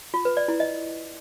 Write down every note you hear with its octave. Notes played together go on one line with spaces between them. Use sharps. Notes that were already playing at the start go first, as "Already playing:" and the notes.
F4
B4
D5
E4
D#5